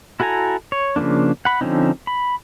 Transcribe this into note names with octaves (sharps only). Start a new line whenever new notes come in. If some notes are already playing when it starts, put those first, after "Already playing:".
E4 F#4 A4 G#5 A#5
C#5
C#3 F3 G#3 A#3 D4
F#5 B5
D3 F3 C4 C#4 D#4
B5